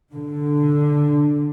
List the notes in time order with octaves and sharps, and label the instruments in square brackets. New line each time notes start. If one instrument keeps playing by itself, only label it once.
[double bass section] D3